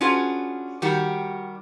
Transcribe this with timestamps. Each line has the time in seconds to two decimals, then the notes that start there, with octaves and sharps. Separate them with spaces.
0.01 C#4 D4 F4 F#4 G#4 B4
0.82 D#3 G3 F#4 G4